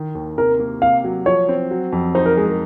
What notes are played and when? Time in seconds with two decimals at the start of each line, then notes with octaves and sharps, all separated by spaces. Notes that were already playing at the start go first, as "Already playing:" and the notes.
Already playing: D#3
0.15 D#2
0.38 C3 A#4
0.59 A#3
0.82 C3 F5
1.04 F#3
1.26 F3 C#5
1.49 C4
1.71 F#3
1.92 F2
2.15 D#4 C5
2.26 A#4
2.37 G#3 G#4
2.48 A#4